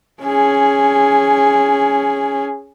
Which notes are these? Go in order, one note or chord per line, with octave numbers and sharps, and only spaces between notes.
C#4 G#4